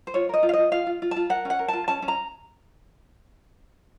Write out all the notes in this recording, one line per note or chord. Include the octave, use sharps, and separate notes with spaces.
C5
F4 C#5
A#4 D#5
F4
F5
F4 D#5
F4 F5
F4
F4
A5
F4
A#4 F#5
C#4 F#5
A#4
F4 A5
C#4 A5
C#4
A#5